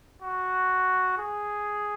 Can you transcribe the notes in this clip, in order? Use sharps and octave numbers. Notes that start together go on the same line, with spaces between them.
F#4
G#4